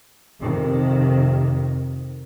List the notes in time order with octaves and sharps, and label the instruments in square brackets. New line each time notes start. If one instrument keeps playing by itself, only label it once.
[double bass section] F2 C3 D#3